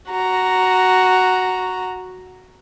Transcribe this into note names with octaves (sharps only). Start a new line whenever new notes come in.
F#4 A#5